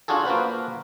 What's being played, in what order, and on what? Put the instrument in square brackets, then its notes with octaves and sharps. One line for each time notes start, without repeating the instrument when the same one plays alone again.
[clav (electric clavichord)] D4 F4 F#4 G#4 A4
A#3 F4 F#4 B4 C5